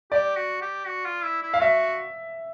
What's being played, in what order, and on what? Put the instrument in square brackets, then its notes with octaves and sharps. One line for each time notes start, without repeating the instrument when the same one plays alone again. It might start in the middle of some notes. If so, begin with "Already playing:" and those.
[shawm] G4 [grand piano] D5
[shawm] F#4
G4
F#4
F4
E4
E4
[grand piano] F5
[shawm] F#4 [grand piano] E5